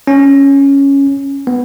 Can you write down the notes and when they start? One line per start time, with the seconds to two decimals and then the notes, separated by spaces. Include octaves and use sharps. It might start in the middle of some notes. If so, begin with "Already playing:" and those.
0.07 C#4
1.47 B3